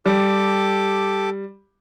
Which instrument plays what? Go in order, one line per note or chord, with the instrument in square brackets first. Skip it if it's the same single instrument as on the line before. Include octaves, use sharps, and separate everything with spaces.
[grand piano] G3 [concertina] G4 A4 D6